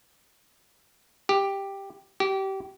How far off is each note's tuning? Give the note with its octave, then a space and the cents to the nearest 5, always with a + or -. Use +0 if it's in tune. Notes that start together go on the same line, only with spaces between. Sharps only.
G4 +5
G4 -25